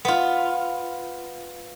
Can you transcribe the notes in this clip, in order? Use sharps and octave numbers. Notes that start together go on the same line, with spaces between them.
B3 F4